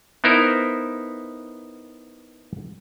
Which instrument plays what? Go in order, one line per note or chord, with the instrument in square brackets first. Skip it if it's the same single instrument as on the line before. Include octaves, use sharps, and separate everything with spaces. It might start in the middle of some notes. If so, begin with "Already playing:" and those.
[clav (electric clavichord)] B3 D#4 E4 A#4 C5